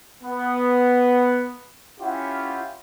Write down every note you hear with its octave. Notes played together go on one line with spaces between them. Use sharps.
B3
C#4 E4 F4 G4 F#5